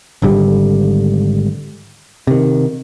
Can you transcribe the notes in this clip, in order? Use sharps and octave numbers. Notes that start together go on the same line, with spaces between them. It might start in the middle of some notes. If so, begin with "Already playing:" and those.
G#1 G#2 D3 G3
C3 D#3